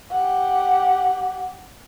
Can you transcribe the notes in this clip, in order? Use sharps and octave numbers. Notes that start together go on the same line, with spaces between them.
G4 F#5